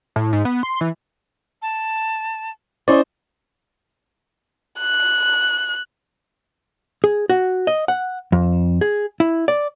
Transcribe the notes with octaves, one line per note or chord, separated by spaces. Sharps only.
A2
G#2
B3
C6
E3
A5
C#4 E4 C5 D5 D#5 C#6
F#6
G#4
F#4
D#5
F#5
F2
G#4
E4
D5